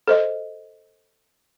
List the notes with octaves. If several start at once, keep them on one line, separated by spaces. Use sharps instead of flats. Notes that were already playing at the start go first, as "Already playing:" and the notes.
A4 C5 D#5